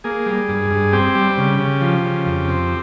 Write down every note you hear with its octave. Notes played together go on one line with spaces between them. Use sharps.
A#3 G#4
G3
G2
G2
C4 G4
G3
C#3
C#3
F3
C#3
F2
C4